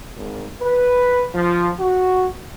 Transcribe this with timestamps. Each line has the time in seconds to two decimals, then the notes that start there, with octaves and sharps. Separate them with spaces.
0.17 G#1
0.61 B4
1.34 F3
1.80 F#4